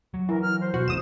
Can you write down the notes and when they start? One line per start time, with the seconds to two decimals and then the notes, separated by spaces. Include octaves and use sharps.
0.14 F#3
0.29 E3 A#4
0.42 F6
0.61 C5
0.74 B2 F#4
0.88 G#1 G2 E3 D#6 E7